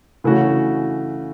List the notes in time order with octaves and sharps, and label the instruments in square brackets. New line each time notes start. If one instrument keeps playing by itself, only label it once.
[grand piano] C#3 E3 A3 C#4 F#4